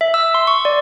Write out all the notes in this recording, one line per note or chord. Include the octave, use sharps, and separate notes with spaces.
E5
E6
C6
C#6
D5